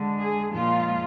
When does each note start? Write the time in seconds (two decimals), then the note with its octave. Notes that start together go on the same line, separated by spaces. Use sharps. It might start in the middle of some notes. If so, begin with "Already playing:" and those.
Already playing: D3 G#3
0.19 G#4
0.51 A#2 F3 G#3 F4